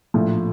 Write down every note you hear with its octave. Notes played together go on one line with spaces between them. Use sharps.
A#1 A2 F3